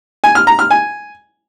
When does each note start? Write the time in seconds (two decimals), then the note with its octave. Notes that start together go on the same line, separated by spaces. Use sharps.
0.24 G#5
0.35 F6
0.47 A#5
0.59 F6
0.71 G#5